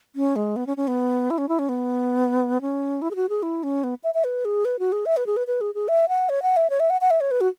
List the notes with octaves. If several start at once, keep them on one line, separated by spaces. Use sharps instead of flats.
C#4
G#3
B3
C#4
C#4
B3
E4
C#4
E4
C#4
B3
C#4
E4
G#4
F#4
G#4
E4
C#4
B3
E5
E5
B4
G#4
B4
F#4
G#4
E5
B4
G#4
B4
B4
G#4
G#4
E5
F#5
C#5
F#5
E5
C#5
E5
F#5
F#5
E5
C#5
B4
F#4